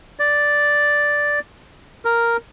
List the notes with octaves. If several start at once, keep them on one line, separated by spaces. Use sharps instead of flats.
D5
A#4